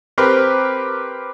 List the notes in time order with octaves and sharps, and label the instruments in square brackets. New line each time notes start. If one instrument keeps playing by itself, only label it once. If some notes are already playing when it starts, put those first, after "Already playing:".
[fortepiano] C4 G4 A#4 B4